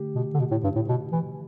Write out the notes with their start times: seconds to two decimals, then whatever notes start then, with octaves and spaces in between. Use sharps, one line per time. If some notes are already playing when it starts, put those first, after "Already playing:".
Already playing: D3 A3 G4
0.15 B2
0.34 D3
0.40 B2
0.51 A2
0.64 G2
0.76 A2
0.89 B2
1.12 E3